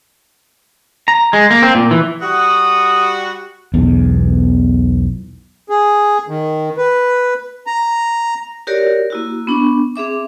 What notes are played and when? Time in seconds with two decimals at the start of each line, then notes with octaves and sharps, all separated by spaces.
1.08 A#5
1.33 G#3
1.51 A#3
1.62 C4
1.75 A#2
1.91 E3
2.21 G3 F#4 D#6
3.74 B1 E2
5.69 G#4
6.28 D#3
6.77 B4
7.67 A#5
8.67 F#4 G4 A#4 C#5 D5
9.10 A#3 E4 F#4
9.47 B3 D4 C#6
9.96 C4 G#4 E5 D6